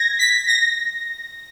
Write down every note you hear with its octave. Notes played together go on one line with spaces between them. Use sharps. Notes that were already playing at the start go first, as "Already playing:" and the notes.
Already playing: G#6 A#6
B6
A#6